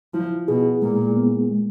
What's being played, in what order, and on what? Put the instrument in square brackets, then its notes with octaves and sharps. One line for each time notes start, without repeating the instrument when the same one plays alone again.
[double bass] F3 [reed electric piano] E4
[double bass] B2 [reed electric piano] G#4
[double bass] A#2 [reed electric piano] G#3
[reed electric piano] B3
G#3